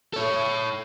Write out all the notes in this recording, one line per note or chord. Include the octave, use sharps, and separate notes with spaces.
A4 C#5